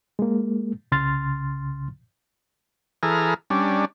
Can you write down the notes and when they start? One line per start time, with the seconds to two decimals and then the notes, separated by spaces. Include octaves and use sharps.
0.19 G#3 A#3
0.92 C2 C#3 C6 F6 A6
3.03 E3 G#4 A4 A#5 F6
3.50 G3 C#4 D4